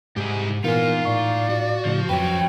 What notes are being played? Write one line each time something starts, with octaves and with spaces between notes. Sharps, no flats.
C2 G#2 G4 G#4
A#2 E3 B3 D#4 F4 A#4 G#5
A2 D5 F5 C#6
F#4
A2 C#3 F3
F2 F3 F#3 C#4 B4 G5